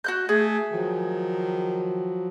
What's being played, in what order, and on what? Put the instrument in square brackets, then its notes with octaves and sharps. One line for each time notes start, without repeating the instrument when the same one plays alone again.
[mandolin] F#4 F#6 G6
[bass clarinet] A3 [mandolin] G#4
[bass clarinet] D#3 [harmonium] F3 F#3